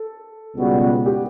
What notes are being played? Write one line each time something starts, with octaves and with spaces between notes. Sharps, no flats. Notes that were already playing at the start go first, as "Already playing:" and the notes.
Already playing: A4
C#2 B2 G3 B3 F#4
G4